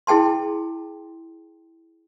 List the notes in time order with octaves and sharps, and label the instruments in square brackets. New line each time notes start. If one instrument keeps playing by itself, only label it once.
[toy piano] E4 G#4 G5 A5 C6